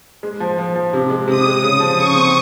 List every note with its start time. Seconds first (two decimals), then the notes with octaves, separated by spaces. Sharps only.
0.23 G#3
0.40 F3
0.58 F3
0.76 F3
0.93 C3
1.10 G#3
1.28 C3 D#6
1.46 G#3
1.63 C#3
1.80 F3
1.97 C#3 C#6
2.15 C4